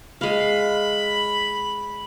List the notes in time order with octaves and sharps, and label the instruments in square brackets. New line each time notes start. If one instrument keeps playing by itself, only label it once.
[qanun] G#3 F5 [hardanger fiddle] B5